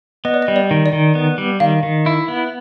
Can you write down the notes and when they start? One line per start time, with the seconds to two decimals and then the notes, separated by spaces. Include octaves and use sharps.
0.25 B3 D#5
0.34 D5
0.42 D#5
0.48 G3
0.56 D5
0.71 D#3
0.86 D5
0.93 D#3
1.15 B3
1.38 G3
1.60 D#3 F5
1.83 D#3
2.06 E4
2.28 B3